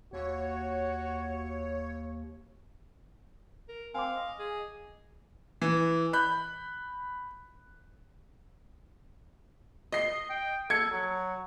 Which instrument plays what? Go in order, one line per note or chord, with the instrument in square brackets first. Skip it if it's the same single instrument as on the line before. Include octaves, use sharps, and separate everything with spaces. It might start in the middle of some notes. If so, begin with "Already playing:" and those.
[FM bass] D#2 [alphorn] F#4 [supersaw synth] C#5
[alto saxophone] A#4
[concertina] C4 [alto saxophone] F5 [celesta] G#5 D6
[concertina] D#5
[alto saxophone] G#4
[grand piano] E3
B5 F#6 G6
[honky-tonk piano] D#5 C7
[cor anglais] G5
[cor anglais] A4 [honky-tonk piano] G#6 C#7
[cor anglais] F#3